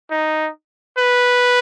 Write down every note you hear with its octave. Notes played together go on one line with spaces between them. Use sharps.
D#4
B4